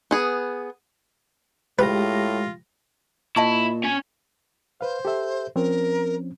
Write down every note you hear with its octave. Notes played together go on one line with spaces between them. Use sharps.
B3 G#4
A2 G#3 F4 G4 B4 A#6
A#2 E4 D#5 A5 C#6
C#4 G#5
B4 C5 F5
G4 A4 E5
F3 C4 C#4 A#4